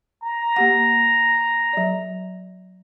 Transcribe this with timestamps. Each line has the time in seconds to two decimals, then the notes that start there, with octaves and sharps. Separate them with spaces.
0.24 A#5
0.56 A#3 G4 F#5
1.73 F#3 D5